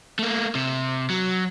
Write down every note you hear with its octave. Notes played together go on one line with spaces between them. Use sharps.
A3 A#3
C3
F#3